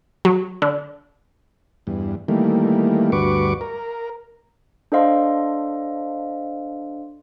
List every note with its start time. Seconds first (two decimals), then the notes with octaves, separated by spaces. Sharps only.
0.25 F#3
0.62 D3
1.87 E2 G2
2.28 D#3 E3 G3 A3 A#3
3.12 D2 G2 F#4 B4 C#6 D6
3.61 A#4
4.92 D4 A4 C5 D#5 F5 C6